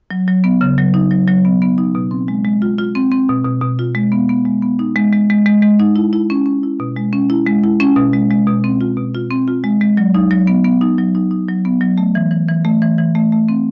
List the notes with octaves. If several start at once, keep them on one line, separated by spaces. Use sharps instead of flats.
F#3
F#3
B3
C#3
F#3
D#4
F#3
F#3
B3
B3
D#4
B2
C4
G#3
G#3
F4
F4
C4
C4
B2
B2
B2
F4
G#3
B3
B3
G#3
B3
D#4
G#3
G#3
G#3
G#3
G#3
D#4
E4
E4
C#4
C#4
E4
B2
G#3
C#4
E4
G#3
E4
C#4
B2
G#3
G#3
B2
C4
F4
B2
F4
C4
F4
G#3
G#3
F#3
D#4
F#3
B3
B3
D#4
F#3
D#4
D#4
F#3
B3
F#3
A3
E3
E3
E3
A3
E3
E3
A3
A3
C4